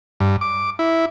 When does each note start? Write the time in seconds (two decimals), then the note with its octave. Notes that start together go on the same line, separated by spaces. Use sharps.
0.20 G2
0.41 D6
0.79 E4